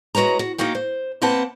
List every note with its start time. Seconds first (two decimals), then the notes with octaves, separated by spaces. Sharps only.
0.15 G#3 F#4 B4 C#5 A#5
0.39 F#4
0.58 A#3 D#4 F#4 F5 G5
0.75 C5
1.22 C3 A#3 C4 B4 F#5 A5